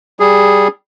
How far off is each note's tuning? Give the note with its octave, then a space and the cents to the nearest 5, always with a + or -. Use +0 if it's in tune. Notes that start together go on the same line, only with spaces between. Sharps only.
G3 +0 G#4 -5